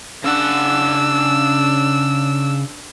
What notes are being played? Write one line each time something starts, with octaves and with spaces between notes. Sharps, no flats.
C#3 D4 F#5 E6